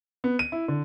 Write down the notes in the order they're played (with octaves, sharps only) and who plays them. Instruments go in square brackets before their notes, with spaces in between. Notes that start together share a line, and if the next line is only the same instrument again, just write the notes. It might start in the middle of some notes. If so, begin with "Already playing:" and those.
[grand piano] B3
D#7
E4
D3